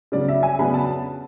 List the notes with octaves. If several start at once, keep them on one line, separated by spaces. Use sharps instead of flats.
C#3 F#3 B3 D4 D5
E5
G#5
C#3 F#3 B3 D4 B5
A5